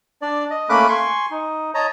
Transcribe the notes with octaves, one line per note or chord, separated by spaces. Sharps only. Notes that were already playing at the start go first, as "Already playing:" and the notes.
D4 D5
D#5
A3 A#3 C#4 B5 D6 F#6
G#5 C6 C#6
D#4
C#5 D#5 A5 A#5